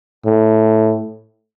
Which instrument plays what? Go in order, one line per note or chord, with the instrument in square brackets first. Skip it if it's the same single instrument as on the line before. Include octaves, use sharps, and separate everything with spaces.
[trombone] A2